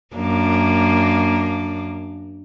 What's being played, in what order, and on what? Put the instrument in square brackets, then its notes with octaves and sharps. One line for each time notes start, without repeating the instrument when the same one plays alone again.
[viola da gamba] F#2 A#3 D4